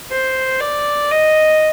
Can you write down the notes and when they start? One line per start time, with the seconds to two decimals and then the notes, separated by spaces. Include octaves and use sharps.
0.12 C5
0.61 D5
1.11 D#5